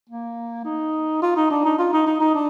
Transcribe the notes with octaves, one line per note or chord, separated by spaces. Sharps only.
A#3
D#4
F4
D#4
D4
D#4
F4
D#4
D#4
D#4
D4